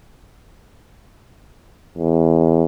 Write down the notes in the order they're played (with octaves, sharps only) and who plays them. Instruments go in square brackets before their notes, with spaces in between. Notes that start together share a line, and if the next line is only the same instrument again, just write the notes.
[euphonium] E2